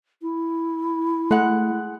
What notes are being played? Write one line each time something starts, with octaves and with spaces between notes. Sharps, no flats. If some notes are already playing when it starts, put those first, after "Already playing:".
E4
G#3 A3 F#5